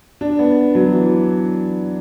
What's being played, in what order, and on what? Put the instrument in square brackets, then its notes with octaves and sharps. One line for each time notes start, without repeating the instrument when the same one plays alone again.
[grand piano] D4
B3
F#3
E3